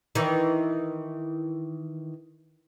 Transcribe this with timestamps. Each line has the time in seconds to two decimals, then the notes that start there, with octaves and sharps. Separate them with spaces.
0.15 D#3 E3